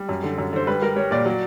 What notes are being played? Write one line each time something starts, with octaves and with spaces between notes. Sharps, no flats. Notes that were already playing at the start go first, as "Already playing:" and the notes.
Already playing: G3
F#2
D3
F#2
D3 C5
G3 B4
G3 A#4
G3 C#5
A#2 D5
F#3